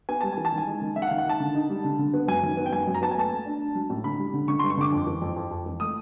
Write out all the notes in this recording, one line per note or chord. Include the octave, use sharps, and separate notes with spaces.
B3 G#5
G3 A5
E3 G#5
A5
D#3
G#5
G#3
D#3
D#3 E5
F#5
F5
D#3
F#5
D#3 A5
D3
D#4
G3
D3
D3
B3
F#2 G#5
D#3
B3
G5
F#2 G#5
F#2
A#5
B3 A5
G#5
A3 A5
A3
D4
D4
F#3
A2
D3 B5
G3
D3
D3 C#6
C6
G2
C#6
D3 D6
F2
E3
F2
F2
F2
E3
A3 D#6